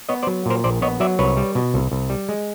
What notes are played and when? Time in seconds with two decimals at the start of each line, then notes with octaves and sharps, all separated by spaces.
0.09 B3 C#5 D#5
0.23 C5 D5
0.27 F#3
0.46 A#2 A#4 C5
0.64 A#1 C5 D5
0.82 B3 C#5 D#5
1.00 F#3 D5 E5
1.19 C2 B4 C#5
1.37 G3
1.55 B2
1.74 C2
1.92 C2
2.10 G3
2.29 G#3